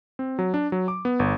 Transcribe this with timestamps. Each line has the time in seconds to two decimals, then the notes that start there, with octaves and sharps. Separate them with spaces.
0.19 C4
0.39 F#3
0.54 D4
0.72 F#3
0.88 D6
1.05 B3
1.19 G1